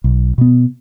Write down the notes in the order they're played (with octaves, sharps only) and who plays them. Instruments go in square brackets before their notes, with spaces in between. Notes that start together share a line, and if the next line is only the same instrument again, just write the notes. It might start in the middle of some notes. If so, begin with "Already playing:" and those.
[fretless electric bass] B1
B2 B3